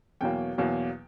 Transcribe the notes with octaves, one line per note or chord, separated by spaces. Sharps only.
E2 B2 F#3 A#3 G5
E2 B2 F#3 A#3